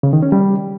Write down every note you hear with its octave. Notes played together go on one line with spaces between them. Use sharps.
C#3
D#3
C#4
G3